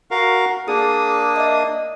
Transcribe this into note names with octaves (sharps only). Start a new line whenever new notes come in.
F#4 A#4 F5
A#3 D4 G#4 D#6
D#5 E5